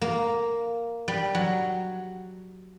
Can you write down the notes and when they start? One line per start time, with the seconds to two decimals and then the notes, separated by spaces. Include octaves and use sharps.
0.01 A#3
1.08 G3
1.35 F#3